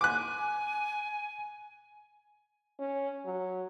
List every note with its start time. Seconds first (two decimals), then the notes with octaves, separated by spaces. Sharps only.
0.01 G#5 D6 F#6
2.79 C#4
3.26 F#3